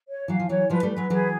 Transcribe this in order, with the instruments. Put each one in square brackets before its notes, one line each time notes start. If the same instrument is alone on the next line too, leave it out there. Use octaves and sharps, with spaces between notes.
[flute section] C#5
[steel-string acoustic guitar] E3 F#3 [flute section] F5
[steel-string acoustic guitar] F3
[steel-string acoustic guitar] E3 F#3 [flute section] C#5
[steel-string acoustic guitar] F3 G3 [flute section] B4
[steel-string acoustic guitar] G3 A3
[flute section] B4
[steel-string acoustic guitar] F#3 G#3
[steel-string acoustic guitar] E3 F#3 [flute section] G#4